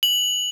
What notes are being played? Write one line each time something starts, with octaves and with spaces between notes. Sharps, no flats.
F#7